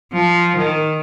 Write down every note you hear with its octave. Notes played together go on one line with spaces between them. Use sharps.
F3
D#3